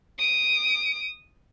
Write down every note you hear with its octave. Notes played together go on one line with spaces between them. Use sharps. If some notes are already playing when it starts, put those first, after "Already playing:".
D#6 D7